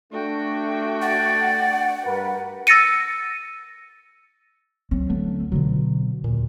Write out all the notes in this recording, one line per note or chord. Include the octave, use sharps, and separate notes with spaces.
A3 D4 F#4 G5
D5 F#5
G2 A#4 B4
E6 A6 A#6 C#7 D#7
F#3 C4
D2 A3 B3
B2 D3 F#3 F4
D#2 A#2